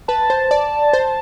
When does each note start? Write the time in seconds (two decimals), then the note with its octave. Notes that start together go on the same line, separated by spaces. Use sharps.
0.08 B4 A5
0.30 C5
0.51 D5
0.93 C5